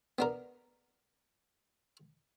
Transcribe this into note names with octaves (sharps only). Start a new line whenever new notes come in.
B3 D4 A#4